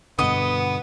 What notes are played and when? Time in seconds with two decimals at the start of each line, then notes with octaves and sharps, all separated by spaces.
0.19 G2 B2 D3 B3 D#5